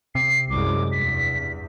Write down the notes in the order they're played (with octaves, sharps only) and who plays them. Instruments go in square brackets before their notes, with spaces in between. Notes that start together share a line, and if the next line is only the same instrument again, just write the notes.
[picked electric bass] C3 [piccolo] C7
[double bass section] C2 F#2 G#3 [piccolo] D6
[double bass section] E2 G2 [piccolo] B6